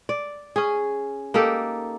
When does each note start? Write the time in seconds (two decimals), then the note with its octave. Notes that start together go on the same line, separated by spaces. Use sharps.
0.09 D5
0.56 C#4 G#4
1.34 A#3 D#4 G4 A4